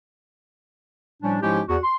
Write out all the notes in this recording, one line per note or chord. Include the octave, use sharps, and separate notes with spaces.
A2 F3 G3 C#4 D4
G#2 F3 G#3 C#4 E4 G4
E2 F#4
C6